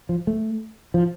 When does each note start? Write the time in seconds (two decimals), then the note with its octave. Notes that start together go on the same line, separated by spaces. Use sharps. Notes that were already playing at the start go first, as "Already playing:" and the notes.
0.09 F3
0.27 A3
0.94 F3